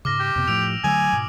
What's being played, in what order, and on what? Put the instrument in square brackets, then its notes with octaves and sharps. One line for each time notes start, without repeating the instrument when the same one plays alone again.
[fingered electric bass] G#2 C#3 [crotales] D6 F6 A#6
[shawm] G4
[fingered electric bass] F2 C3 B3
[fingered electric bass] A2 F3 A3 [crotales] E6 D7 F7
[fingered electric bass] D3 F#3 A3 [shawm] G#5 [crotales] D#6 E6
[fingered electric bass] G#2 B2